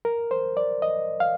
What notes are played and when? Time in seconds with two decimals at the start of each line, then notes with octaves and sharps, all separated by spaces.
0.05 A#4
0.31 C5
0.57 D5
0.82 D#5
1.20 F5